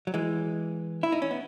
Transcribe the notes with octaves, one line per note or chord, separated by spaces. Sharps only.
F#3
E3 G#3
E4
D#4
C#4
B3